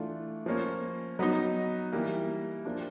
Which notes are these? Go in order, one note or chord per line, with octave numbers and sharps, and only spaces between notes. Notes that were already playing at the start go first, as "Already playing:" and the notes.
Already playing: E3 A3 D4 F4
F3 A#3 C#4
F#3 B3 D#4
E3 G3 A#3
F3 A#3 D4